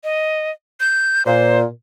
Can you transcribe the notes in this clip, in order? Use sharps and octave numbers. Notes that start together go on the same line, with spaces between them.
D#5
G6
A#2 C5